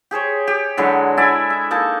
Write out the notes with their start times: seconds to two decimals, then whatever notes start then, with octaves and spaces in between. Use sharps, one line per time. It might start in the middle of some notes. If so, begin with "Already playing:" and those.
0.11 G4 G#4 C5 C#5
0.47 G4
0.77 D3 F#3 G#3 E4
1.17 E4 D5 E5 G#5
1.50 E5
1.71 A#3 D#4 A4 A5